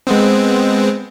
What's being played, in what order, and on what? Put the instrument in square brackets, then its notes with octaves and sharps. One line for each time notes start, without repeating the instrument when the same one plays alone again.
[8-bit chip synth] G#3 B3 C4